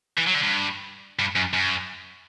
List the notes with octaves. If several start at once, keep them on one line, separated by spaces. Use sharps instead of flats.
E3
F#3
D3
G2
G2
F#2
F#2